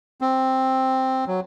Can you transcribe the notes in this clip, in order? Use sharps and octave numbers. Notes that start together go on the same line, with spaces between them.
C4
F#3